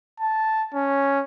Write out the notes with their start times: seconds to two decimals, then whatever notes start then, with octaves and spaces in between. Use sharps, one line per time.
0.20 A5
0.74 C#4